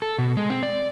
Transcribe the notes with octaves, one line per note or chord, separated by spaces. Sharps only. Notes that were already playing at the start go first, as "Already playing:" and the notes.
A4
B2
G#3
C4
D5